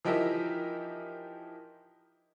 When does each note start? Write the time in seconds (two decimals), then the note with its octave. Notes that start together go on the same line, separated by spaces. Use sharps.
0.05 E3 F3 D#4 G4 A#4 E5